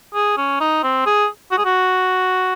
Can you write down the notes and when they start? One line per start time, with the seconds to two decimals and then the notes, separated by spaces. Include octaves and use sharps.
0.15 G#4
0.37 C#4
0.60 D#4
0.83 C4
1.06 G#4
1.51 F#4
1.58 G#4
1.65 F#4